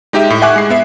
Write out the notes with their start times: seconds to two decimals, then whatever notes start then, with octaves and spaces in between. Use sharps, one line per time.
0.13 G#3 D#4 G4 D#5 E5
0.30 A2
0.42 E5 F#5 G#5 C#6 D6 F#6
0.56 G#3 C7
0.70 B3 E5